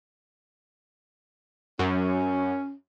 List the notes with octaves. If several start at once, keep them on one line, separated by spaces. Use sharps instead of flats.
F#2 C#4